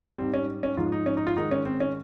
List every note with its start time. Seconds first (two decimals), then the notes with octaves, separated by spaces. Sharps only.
0.18 G#2 G3 C4
0.34 C#4
0.63 C#4
0.77 G#2 F3 G#3 F4
0.92 D#4
1.06 C#4
1.17 D#4
1.27 F4
1.36 G#2 D#3 G#3 D#4
1.51 C#4
1.65 C4
1.80 C#4